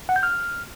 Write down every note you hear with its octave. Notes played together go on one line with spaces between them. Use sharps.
F#5
G6
F6